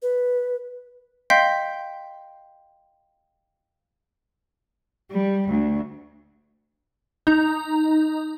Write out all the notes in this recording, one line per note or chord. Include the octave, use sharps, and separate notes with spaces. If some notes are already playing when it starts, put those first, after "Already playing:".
B4
D#5 F5 G5 C6 G6 B6
G3
D2
D#4 A#5